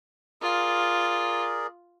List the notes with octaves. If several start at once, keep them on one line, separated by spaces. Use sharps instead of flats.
F4 G#4 A#4 D5